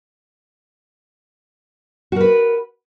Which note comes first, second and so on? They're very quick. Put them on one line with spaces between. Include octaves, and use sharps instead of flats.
F#4 A#4 B4